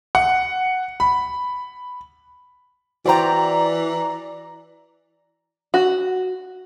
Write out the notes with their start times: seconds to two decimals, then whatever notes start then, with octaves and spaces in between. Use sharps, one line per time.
0.15 F#5
1.00 B5
3.06 E3 F#4 C5 D5 G5 A#5
5.74 F#4